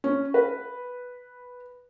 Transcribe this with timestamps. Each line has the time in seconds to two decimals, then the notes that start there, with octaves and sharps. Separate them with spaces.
0.04 C#4
0.34 B4